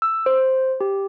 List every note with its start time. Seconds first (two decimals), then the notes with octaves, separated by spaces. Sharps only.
0.02 E6
0.26 C5
0.81 G4